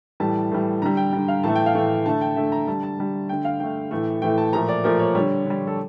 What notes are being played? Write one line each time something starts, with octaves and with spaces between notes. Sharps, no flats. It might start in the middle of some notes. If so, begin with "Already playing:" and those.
A2 E3 G3 A5
A2 E3 G3
D3 G3 A#5
G5
D3 G3
F5
A2 E3 A3 A5
G5
F5
A2 E3 A3 G5
D3 A3 A5
G5
D3 A3 E5
A#5
D3 G3 A5
A5
D3 G3
D3 A3 G5
F5
D3 A3 G5
A2 E3 A3
A2 E3 A3 G5
A5
A#2 F3 A3 A#5
D5
A#2 F3 A3 A#4
C#5
D3 G3 C#5
D3 G3
A4